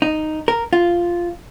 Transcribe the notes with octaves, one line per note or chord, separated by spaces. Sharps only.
D#4
A#4
F4